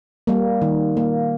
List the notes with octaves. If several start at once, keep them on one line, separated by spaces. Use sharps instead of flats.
G3 A#3
D#3
A#3